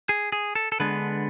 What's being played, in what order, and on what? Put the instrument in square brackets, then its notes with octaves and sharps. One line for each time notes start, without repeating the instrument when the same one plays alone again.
[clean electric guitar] G#4
G#4
A4
A4
D3 G#3 B3 D4 B4